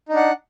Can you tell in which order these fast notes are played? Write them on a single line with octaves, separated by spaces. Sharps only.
D#4 D4 F#5